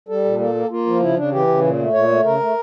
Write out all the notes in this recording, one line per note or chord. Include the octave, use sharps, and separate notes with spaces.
G3 A4
A#2
A#3 A4
A#3
A#3 F4
F3
C#3 E4
C#3 D4
E3 G4
C#3
A#2
A3
A#2 C#5
A3
C#3 A#4
A3